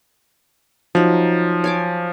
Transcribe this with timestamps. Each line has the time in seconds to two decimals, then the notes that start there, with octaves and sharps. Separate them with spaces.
0.95 F3 F#3 D#4
1.64 C#5 G#5 D6